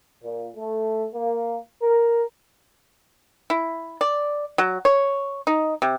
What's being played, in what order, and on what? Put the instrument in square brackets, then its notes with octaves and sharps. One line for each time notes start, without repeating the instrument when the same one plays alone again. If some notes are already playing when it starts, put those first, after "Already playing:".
[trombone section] A#2
A3
A#3
A#4
[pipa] E4
D5
F#3
C#5
D#4
C3